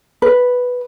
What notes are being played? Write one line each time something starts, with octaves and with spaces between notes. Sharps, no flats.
B4